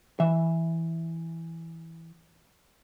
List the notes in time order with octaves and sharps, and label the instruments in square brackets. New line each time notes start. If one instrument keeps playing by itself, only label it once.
[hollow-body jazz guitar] E3 E5